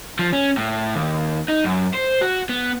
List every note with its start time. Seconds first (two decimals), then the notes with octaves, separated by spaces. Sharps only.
0.19 F3
0.33 C#4
0.57 A2
0.94 D#2
1.48 D#4
1.64 F#2
1.94 C5
2.21 F#4
2.49 B3